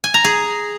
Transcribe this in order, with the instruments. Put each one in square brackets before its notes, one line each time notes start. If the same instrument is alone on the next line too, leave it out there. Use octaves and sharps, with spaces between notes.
[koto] G#5
A#5
G#4